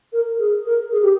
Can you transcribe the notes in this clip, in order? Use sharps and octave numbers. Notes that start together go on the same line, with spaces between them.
A#4
G#4
A#4
G#4
G4